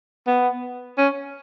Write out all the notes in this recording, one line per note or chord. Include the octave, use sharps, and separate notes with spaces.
B3
C#4